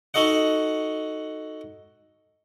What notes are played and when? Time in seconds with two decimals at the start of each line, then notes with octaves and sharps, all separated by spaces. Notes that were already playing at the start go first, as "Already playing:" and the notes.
0.14 D#4 F#4 A4 D#5 F#5